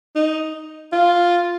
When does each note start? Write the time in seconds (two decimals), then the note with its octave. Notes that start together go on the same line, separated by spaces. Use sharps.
0.15 D#4
0.92 F4